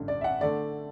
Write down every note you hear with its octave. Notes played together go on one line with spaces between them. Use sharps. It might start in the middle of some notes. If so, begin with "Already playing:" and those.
Already playing: A1 G2 D3
D5
E5
F#5
D3 A3 D5